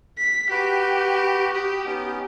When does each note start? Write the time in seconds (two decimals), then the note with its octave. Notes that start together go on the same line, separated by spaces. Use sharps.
0.18 B6
0.51 F#4 G4 B4
1.54 G4 B5 D#6
1.85 B3 C#4 D#4